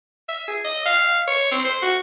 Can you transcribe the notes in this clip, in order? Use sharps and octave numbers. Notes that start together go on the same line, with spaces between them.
E5
G#4
D#5
F5
C#5
C4
C5
F#4